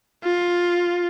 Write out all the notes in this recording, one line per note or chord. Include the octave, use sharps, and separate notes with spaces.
F4